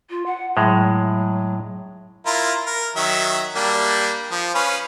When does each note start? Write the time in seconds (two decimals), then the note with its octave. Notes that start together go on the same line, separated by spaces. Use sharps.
0.10 F4
0.26 F#5
0.57 A2 F#3 G#3
2.26 E4 F4 A#4
2.66 A#4
2.96 D#3 F#3 E5
3.55 G3 A#3 D4
4.31 F3
4.55 C#4 B4 F5